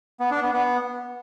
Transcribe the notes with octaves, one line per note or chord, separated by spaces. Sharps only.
B3
D4
B3
B3